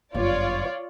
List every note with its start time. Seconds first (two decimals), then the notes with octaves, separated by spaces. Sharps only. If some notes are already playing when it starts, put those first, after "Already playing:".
0.15 G1 F#2 F4 C#5 D5